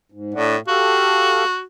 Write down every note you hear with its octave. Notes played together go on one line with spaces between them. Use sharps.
G#2
A2 D4 D5 F#5
F#4 G4 A4 F5